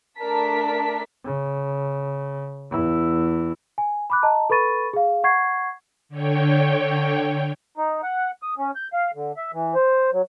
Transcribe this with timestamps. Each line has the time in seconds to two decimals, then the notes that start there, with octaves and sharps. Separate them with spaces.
0.19 A3 D4 A#4 A5 B6
1.24 C#3
2.71 E2 E4
3.78 G#5
4.10 B5 D6 F#6
4.23 D#5 A5 A#5
4.50 A4 B4 B5 C#6 A6 D#7
4.93 G#4 F5
5.24 F#5 C#6 G#6 C7
6.09 D3 C#5 G5
7.77 D#4
8.03 F#5
8.42 D#6
8.58 C#4
8.76 G6
8.93 F5
9.15 D3
9.37 E5
9.53 E3
9.75 C5
10.13 F#3